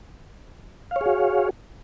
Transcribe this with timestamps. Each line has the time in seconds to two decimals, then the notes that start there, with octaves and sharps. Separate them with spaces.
0.91 F5
0.96 C#5
1.01 G#4
1.06 F#4